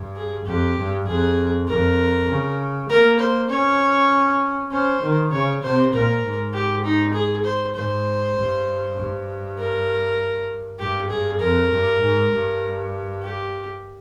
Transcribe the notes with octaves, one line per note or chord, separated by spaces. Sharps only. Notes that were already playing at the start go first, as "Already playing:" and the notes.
Already playing: G2
G#4
F2 G4
G2
F2 G#4
F2 A#4
C#3
A#3 A#4
C5
C#4 C#5
C#4 C5
D#3
C#3 C#5
C3 C5
A#2 A#4
G#2
G4
D#4
G#4
C5
G#2 C5
G2
G2
A#4
G2 G4
G2 G#4
F2 A#4
G2
G#2
G2
G4